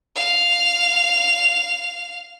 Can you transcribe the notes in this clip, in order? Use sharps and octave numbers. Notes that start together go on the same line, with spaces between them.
F5 F7